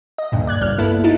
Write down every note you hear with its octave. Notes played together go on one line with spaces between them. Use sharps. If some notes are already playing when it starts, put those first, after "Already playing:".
D#5
D2 G2 A#2
D5 F#6 G#6
G1 C#2 G2 F6 F#6
A#3 B3 E4 A4 B4
D#4 E4 A6